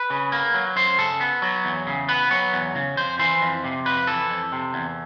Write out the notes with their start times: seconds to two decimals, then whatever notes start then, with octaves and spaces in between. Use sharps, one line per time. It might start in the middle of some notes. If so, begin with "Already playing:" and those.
Already playing: B4
0.10 C#3
0.32 A#3
0.54 F#3
0.76 F#2 C5
0.98 C#3 A4
1.20 B3
1.42 F#3
1.65 E2
1.87 C#3
2.09 B3 B4
2.31 F#3 C#5
2.53 E2
2.75 C#3
2.97 F2 C5
3.19 E3 C5
3.42 F2
3.64 C3
3.85 F2 B4
4.07 E3 A4
4.30 F2
4.52 C3
4.74 E2